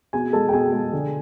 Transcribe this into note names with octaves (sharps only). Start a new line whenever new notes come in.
B2 G#4 G#5
G#3 A4 A5
G5
B2 G#4 G#5
G#3
D3